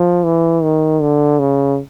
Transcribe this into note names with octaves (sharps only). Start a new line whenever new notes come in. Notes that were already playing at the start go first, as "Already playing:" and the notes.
Already playing: F3
E3
D#3
D3
C#3